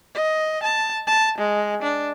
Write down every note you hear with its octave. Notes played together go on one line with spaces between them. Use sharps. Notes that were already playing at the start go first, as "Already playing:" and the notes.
D#5
A5
A5
G#3
D4